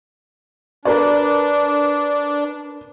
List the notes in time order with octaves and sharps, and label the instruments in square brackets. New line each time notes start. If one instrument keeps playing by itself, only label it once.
[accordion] D4 [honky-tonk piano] A#4 B4 D5